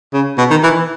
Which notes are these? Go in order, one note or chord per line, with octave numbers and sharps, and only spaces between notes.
C#3
B2
D#3
E3